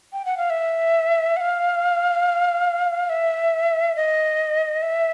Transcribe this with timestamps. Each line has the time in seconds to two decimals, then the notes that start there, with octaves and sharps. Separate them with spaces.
0.13 G5
0.25 F#5
0.37 F5
0.50 E5
1.37 F#5
1.41 F5
3.10 E5
3.96 D#5
4.82 E5